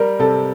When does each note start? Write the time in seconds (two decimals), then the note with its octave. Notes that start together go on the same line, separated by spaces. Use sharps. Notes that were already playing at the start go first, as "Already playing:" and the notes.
Already playing: G3 A#4
0.19 C3 A4